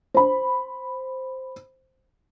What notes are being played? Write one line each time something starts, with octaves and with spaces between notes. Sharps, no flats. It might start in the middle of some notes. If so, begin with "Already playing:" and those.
C5 B5